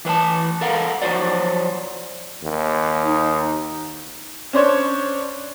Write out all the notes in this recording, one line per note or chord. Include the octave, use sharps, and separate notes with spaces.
E3 B4 E5 A5
A4 A#4 F5 F#5
F3 F#3 F#4 A4 C5 D5
D#2
D#4
C#4 D4 C5 C#5